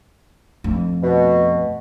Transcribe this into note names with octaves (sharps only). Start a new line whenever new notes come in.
F2 A3
B2